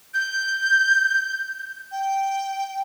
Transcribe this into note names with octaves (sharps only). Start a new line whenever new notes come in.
G6
G5